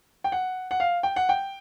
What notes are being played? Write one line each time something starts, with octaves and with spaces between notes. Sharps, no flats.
G5
F#5
F#5
F5
G5
F#5
G5